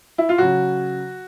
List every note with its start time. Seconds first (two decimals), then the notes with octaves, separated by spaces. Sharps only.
0.18 E4
0.29 F4
0.38 C#3 F#3 F#4